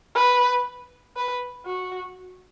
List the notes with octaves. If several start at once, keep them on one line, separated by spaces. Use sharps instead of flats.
B4
B4
F#4